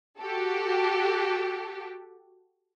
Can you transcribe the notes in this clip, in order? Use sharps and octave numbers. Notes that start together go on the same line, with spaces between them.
F#4 G4 A4